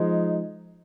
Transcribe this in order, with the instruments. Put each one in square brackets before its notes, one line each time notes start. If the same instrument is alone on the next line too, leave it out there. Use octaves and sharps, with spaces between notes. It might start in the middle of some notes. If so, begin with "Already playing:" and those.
Already playing: [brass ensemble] F3 G#3 D#4